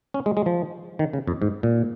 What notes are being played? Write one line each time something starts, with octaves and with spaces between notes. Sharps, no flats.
C#4
G#3
G#3
F3
D#3
C#3
F2
G#2
A#2